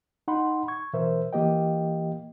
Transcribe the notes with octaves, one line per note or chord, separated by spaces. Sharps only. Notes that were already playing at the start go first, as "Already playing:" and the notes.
D#4 F#5 B5 C6
C#6 G#6
B2 E3 A#4 C5 E5
E3 A#3 G4 D#5 G5